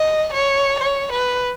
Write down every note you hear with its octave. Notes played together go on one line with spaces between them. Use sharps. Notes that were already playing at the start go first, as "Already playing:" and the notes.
Already playing: D#5
C#5
C#5
B4